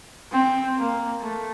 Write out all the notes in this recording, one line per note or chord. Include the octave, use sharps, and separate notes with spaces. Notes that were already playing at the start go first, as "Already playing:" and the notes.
C4
A#3
A3